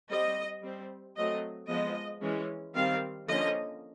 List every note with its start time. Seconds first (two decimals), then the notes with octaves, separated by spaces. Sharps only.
0.10 G3 C4 D#5
0.63 G3 C4
1.17 F#3 A3 C4 D#5
1.69 F3 G#3 B3 D#5
2.22 E3 G#3 C#4
2.75 D#3 G3 C4 F5
3.28 D3 F3 A#3 C#4 D#5